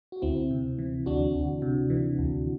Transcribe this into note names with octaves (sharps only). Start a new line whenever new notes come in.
F#4
D2 C4 E4
C3
E3
D2 D4 F#4
D2
C3
E3
D2